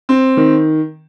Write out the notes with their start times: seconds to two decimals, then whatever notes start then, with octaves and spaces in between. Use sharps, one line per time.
0.09 C4
0.37 D#3